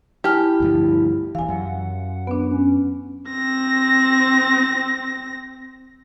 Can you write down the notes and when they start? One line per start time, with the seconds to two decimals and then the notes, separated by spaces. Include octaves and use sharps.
0.24 E4 G4 G#5 A5 F6
0.60 D2 G2 F3
1.35 D#1 E3 F5 G#5
1.49 F#2 F#5
2.27 B3 D4 B4
2.51 C#4
3.31 C4 A#6